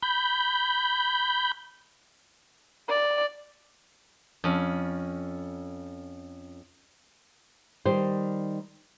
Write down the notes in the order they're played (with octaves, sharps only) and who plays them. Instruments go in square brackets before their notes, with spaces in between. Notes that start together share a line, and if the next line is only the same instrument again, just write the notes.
[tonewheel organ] B5 G6
[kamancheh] D5
[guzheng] F2 C#4
[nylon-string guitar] D#3 G3 C5